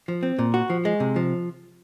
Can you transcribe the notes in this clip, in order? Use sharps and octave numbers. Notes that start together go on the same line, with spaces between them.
F3
C4
A#2
F#4
F3
G#3
C3
F3